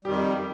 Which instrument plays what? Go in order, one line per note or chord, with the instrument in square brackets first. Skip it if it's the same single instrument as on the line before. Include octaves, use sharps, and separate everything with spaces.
[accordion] F2 D#3 G3 [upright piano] G4